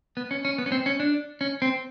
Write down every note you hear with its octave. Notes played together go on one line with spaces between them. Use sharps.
B3
C#4
C#4
B3
C#4
C4
C#4
D4
C#4
C4